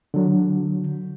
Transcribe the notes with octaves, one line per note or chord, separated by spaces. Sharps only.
D3 F#3